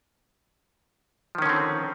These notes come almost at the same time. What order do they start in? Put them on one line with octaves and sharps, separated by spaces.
F3 D#3 C#4 D3 C4